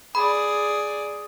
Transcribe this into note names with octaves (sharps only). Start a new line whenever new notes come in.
G#4 D5 B5